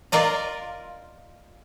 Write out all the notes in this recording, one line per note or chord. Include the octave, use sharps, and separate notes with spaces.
F4 A#4 D5 D#5